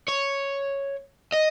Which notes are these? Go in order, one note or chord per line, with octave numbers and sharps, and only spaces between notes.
C#5
D#5